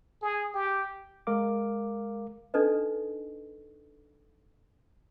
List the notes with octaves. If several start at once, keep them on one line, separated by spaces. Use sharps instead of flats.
G#4
G4
G#3 A#4 F5 D6
D4 D#4 A4 B4 D#5